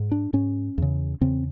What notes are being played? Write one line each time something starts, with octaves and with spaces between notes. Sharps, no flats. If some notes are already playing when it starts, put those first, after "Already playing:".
Already playing: G#2
D4
G#2 C#4
E2 C#3
E2 C#3 C4